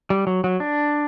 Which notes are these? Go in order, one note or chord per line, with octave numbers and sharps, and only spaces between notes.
G3
F#3
F#3
D4